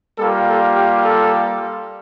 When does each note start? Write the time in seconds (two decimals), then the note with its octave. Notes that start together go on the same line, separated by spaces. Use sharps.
0.18 G3 A#3 F4 A4
0.48 A4
0.76 G4
1.05 A4